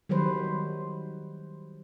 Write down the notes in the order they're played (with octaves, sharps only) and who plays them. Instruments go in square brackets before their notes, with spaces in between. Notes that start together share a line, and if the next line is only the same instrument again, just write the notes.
[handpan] D#3 F#3 G3 B4 C5